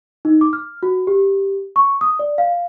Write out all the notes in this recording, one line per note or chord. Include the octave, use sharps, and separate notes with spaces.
D#4
D6
F6
F#4
G4
C#6
D#6
D5
F5